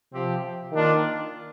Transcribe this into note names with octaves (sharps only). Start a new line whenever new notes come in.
C3 F3 C4 G4
D#3 A#3 D4 F4